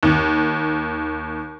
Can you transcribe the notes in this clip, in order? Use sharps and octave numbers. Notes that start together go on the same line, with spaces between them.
D#2